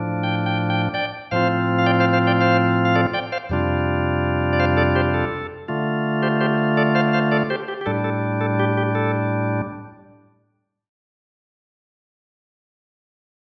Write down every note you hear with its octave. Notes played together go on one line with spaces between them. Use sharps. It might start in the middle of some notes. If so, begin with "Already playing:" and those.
Already playing: A2 F3 D4
G5
G5
G5
D5 G5
A2 F3 C4 F4 C5 F5
F5
D5 G5
C5 F5
C5 F5
D5 G5
C5 F5
F5
A4 D5
D5 G5
C5 F5
F2 C3 G3 D4 F4
D5
C5 F5
A4 D5
G4 C5
A4
D3 A3 F4
G4 C5
G4 C5
A4 D5
C5 F5
C5 F5
A4 D5
G4 C5
G4
G4
A2 G3 D4 A4
A4
A4
G4
G4
A4